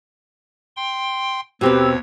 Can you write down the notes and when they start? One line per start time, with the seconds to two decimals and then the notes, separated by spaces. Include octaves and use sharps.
0.77 G5 C6
1.61 D#2 B2 C4 G4 B4 C#5 E6